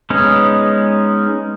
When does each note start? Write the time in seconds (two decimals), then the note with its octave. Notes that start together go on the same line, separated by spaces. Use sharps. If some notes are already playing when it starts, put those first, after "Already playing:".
0.10 G#3 B3 C#4 D#4